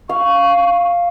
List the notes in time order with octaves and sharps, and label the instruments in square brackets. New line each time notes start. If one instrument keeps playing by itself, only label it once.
[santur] F5 [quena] C#6